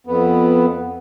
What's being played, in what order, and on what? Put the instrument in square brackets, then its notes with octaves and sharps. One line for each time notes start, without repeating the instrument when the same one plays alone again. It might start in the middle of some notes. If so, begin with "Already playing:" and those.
[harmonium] F2 B3